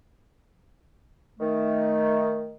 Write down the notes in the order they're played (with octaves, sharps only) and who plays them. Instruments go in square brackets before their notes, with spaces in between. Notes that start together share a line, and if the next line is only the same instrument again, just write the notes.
[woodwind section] D#3 A3